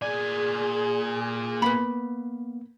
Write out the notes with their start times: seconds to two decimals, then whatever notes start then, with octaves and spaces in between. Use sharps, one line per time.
0.02 A#2 G#4 D5 G#5
1.62 A#3 B3 B4 B5